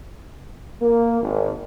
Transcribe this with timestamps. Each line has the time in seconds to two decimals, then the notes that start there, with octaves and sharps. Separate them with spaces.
0.81 A#3
1.21 G#1